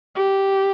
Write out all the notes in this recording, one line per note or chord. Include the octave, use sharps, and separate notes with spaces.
G4